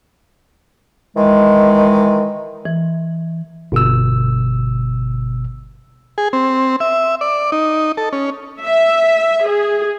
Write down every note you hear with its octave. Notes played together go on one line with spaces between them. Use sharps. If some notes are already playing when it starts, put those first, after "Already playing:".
D#3 E3 G#3
E3
G1 B2 E6
G#4
C4
E5
D5
D#4
A4
C#4
E5
G#4